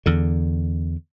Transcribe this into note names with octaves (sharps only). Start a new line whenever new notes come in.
E2 D3